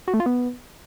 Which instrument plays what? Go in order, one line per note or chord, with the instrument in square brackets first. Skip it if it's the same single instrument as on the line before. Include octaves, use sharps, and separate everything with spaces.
[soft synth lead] F#4
A3
F4
B3